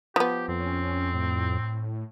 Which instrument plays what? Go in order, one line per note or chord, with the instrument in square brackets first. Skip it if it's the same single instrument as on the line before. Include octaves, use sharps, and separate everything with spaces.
[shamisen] F3 B3 [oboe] G4
[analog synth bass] F2 [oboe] C4
[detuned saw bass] C#4
A2